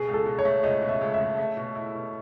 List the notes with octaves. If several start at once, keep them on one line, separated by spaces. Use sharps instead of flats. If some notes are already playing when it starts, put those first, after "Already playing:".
Already playing: B2 G#4
C#2
A4
B2
C#5
A3
C#2 D#5
B2
E5
C#2
E5
A3
A3
B2
E4
B2